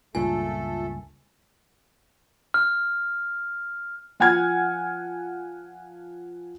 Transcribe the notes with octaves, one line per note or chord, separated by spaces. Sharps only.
C#2 G2 A#2 A3 F4 A4 G#5
F6
F3 F#5 G#5 F6 G#6